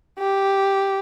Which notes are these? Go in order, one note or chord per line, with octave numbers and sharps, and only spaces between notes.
G4